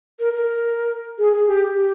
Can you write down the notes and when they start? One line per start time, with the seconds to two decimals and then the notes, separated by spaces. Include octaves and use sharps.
0.20 A#4
0.34 A#4
1.18 G#4
1.33 G#4
1.47 G4
1.74 G4